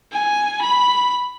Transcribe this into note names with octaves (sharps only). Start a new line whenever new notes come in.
G#5
B5